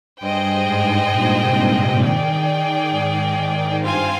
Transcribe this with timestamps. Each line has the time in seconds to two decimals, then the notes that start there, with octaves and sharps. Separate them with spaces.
0.20 G2 G#4 C5 D#5 G5
0.65 G#2
1.11 A#2
1.41 C3
1.70 C3
2.00 D#3 G#4 D5 G5
2.46 D#3
2.91 G#2
3.81 G2 C4 F4 C5 F5 G#5